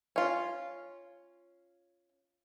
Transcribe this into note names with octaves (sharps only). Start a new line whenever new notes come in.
C#4 F4